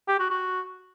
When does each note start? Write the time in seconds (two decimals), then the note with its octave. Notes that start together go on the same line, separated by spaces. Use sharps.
0.08 G4
0.19 F#4
0.31 F#4